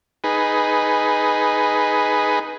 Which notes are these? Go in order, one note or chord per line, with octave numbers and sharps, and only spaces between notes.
D#4 G#4 B4